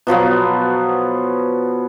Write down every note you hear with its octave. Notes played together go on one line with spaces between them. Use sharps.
B2 F3 F#3 B3